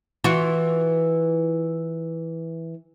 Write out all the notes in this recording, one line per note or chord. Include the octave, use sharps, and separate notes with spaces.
E3 F4 F#4